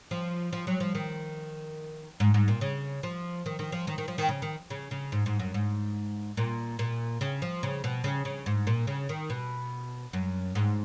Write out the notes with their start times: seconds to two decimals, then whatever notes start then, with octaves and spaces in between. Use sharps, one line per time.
0.11 F3
0.53 F3
0.67 F#3
0.80 F3
0.95 D#3
2.20 G#2
2.34 G#2
2.48 A#2
2.61 C#3
3.03 F3
3.46 D#3
3.59 D#3
3.72 F3
3.87 D#3
3.98 D#3
4.08 F3
4.18 D#3
4.29 C#3
4.42 D#3
4.70 C#3
4.91 C#3
5.12 G#2
5.26 G#2
5.40 F#2
5.54 G#2
6.37 A#2
6.79 A#2
7.21 C#3
7.42 F3
7.63 C#3
7.84 B2
8.04 C#3
8.25 C#3
8.46 G#2
8.67 A#2
8.87 C#3
9.09 D#3
9.30 B2
10.13 F#2
10.55 G#2